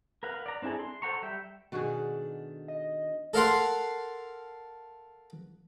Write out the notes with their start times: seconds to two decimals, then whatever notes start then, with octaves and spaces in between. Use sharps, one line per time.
0.23 A#4 B4 F5 F#5
0.46 D5 A#5
0.62 C4 D4 E4 G#4 A4
0.79 C6
1.02 A4 C5 F#5 A#5 C#6
1.22 G3 E5 G5
1.72 B2 D#3 A3 D4 F#4 G#4
2.68 D#5
3.34 A4 A#4 F5 F#5 C6